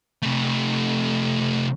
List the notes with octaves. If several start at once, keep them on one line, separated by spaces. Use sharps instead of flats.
C3 A3